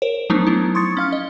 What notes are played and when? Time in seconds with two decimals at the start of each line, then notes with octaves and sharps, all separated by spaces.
0.02 A#4 C5 C#5
0.30 F3 F#3 A3 B3 D4 D#4
0.47 F#3 B3 E4
0.75 C6 C#6 D#6 G#6 A6 C#7
0.97 C#4 F5 F6
1.12 D#5